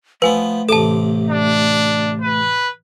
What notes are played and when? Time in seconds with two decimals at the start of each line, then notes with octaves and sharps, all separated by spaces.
0.22 F3 A3 B3 B4 G#5
0.69 A1 C3 A4 A5 D6
1.30 D4
2.21 B4